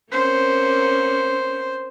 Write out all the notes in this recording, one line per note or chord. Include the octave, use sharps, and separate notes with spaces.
A#3 C4 C#4 C5